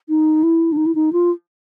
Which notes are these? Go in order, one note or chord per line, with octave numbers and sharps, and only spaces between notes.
D#4
E4
D4
D#4
E4
D#4
F4